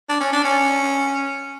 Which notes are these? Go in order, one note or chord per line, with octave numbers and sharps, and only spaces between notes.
D4
C#4
D4
C#4